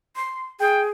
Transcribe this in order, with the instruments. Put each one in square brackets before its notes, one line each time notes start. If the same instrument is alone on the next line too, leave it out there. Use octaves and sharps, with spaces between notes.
[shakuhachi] C6
[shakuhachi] G#4 [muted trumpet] G5